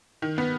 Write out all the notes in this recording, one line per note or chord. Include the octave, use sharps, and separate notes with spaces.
D#3
B3